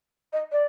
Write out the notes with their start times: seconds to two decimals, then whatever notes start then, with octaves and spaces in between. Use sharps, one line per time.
0.33 D#5
0.52 D5